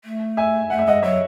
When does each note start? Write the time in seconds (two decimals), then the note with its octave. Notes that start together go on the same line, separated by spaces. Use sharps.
0.05 A3
0.37 E5 G#5
0.70 A3 F#5
0.79 E5
0.86 G#3 D#5 F#5
1.02 F#3 C#5 E5